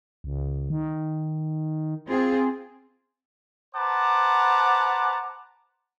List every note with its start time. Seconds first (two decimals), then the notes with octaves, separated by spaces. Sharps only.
0.24 C#2
0.70 D#3
2.07 C4 F4 G#4
3.75 B4 C5 F#5 A5 A#5 D6